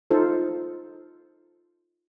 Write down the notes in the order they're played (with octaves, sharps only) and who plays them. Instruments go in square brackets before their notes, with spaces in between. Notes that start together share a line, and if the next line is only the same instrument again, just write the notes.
[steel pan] D#4 F4 A4 C5